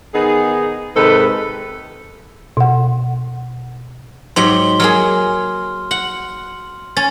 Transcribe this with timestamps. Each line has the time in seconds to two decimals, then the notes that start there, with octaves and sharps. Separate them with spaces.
0.13 D#3 B3 D#4 G#4
0.95 G#2 C3 D#3 A4 B4
2.57 B2 F#5
4.36 G#2 F#3 G4 C6 G7
4.80 F#3 A#3 G#4 F6
5.91 F#5 F#7
6.97 C#4 A6